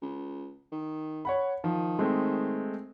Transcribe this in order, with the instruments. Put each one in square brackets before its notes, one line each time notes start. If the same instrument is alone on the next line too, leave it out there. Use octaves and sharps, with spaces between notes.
[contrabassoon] C#2
D#3
[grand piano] C#5 F#5 B5
[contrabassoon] D#3 [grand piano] F3
[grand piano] G#3 A3 C4